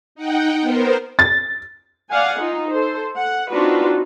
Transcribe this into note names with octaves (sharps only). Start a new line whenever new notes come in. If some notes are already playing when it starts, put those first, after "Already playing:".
D#4 F#5 G5
B3 A#4 C5
A6
D5 F5 F#5 G#5
D#4 F4
A4 C5
F#5
C4 D4 D#4 F4 F#4 B4